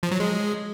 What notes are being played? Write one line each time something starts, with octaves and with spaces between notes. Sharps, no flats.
F3
F#3
G#3